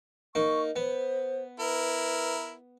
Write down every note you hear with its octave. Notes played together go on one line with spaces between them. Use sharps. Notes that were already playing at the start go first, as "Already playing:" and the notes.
A#3 D#4 C#6
B3 C5
E4 A#4 B4